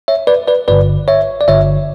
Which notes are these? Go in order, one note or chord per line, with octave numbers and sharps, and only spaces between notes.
C#5 E5
B4 D5
B4 D5
G1 G2 D3 B4 D5
C#5 E5
D5
G1 G2 D3 C#5 E5